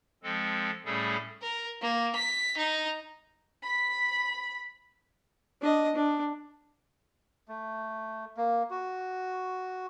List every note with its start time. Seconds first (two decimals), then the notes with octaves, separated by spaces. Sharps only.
0.23 F3 G#3 C4 A4
0.86 A2 G3 A3 C#4 G#4 A4
1.42 A#4
1.81 A#3
2.15 B6
2.57 D#4
3.63 B5 B6
5.62 D4 D#5
5.95 D4
7.48 A3
8.37 A#3
8.70 F#4